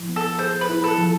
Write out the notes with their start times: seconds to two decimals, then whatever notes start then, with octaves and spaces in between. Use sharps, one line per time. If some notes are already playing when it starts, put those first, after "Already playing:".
Already playing: F3 E4
0.09 B3
0.16 A4
0.39 G#4 C5
0.61 B4
0.69 E4
0.84 A4
0.98 F3